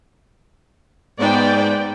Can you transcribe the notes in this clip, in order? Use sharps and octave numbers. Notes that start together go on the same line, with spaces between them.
G#2 B3 D5 G5